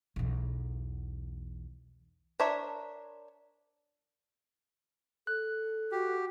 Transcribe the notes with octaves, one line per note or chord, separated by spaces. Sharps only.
B1 E2
D4 A#4 C5 C#5 E5
A4 F#6
F#4 G4